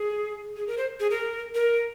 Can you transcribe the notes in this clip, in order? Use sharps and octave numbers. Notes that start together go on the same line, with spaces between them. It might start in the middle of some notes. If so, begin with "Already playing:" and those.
Already playing: G#4
G#4
A#4
C5
G#4
A#4
A#4